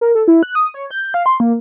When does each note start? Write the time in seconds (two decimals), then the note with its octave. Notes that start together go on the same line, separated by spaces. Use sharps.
0.01 A#4
0.15 A4
0.28 E4
0.43 F#6
0.55 D#6
0.74 C#5
0.91 G6
1.14 F5
1.26 C6
1.40 A#3